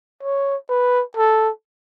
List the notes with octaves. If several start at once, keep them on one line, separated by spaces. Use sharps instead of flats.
C#5
B4
A4